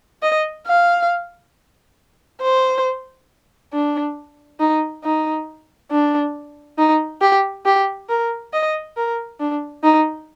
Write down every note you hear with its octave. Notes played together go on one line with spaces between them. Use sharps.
D#5
F5
C5
D4
D#4
D#4
D4
D#4
G4
G4
A#4
D#5
A#4
D4
D#4